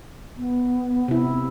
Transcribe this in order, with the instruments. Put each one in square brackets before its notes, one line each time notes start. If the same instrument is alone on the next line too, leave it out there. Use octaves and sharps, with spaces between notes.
[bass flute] B3
[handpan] C3 E4